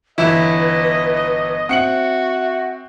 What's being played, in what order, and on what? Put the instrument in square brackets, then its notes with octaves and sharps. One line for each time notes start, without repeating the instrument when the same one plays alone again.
[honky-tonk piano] G1 E3 E7 [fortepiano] E4 [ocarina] B4 [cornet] D#5
[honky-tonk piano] C4 C#7 F#7 [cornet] F#4 [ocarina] E5 [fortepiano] F#5